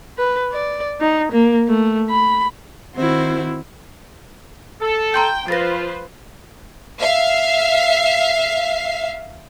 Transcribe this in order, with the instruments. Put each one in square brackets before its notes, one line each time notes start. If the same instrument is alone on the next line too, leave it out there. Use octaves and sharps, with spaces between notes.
[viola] B4
D5
D#4
A#3
A3
B5
[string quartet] D#3 C4 E4 F#4 C5
[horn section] A4
[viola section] G5 [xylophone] A#5 C6 G6
[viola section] F3 B4 C5 [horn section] F4 [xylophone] A6 A#6
[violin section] E5 F5 C7